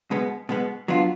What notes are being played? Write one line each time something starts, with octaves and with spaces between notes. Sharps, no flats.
B2 G#3 B3
B2 G#3 B3
F#3 B3 D4 F4